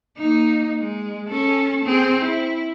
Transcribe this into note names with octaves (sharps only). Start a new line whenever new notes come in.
A#3 D#4
G#3
C#4 A4
C4 G#4
E4